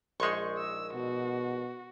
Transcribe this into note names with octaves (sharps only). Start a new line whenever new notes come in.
A#1 G#3 D#4 C6 C#6
E6
B2 F#4